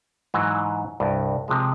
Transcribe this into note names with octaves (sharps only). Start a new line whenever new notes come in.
G#2 E3 F#3
C2 G2
C3 F3 G#3